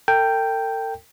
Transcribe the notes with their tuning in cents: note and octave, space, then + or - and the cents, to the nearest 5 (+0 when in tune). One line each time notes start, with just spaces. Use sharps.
A4 +45 G5 +0